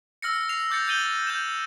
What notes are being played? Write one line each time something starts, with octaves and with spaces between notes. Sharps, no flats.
E6 F6 A#6 C#7
C7 F7
D6 G6 A6 C#7
G6 A6 D#7 F#7 G7
G6 E7